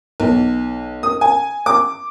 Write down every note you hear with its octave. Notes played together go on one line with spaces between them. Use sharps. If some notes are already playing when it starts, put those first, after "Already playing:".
B1
D#6
G#5
D6